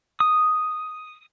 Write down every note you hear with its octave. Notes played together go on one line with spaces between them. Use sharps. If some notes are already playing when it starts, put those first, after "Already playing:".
D#6